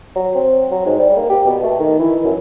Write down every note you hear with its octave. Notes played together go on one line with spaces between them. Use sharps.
F#3
C4
F#3
G#2
G3
A#3
G4
B2
A3
D#3
E3
F#2